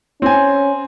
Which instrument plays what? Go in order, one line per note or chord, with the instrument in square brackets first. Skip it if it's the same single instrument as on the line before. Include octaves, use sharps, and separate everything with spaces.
[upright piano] C4 G#5 [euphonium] C#4